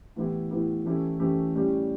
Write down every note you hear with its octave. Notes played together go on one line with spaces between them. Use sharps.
A2 E3 B3 E4 G4
A2 E3 B3 E4 G4
E3 A3 C#4 E4 G4
E3 A3 C#4 E4 G4
A2 G3 C#4 G4